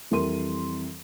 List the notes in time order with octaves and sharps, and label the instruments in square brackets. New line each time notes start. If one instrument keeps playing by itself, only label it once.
[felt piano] F2 E3 G3 A#4 C6 D#7